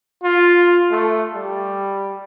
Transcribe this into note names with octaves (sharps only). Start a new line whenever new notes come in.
F4
A3
G3